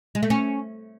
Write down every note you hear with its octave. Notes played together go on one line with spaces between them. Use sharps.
G#3
A3
C#4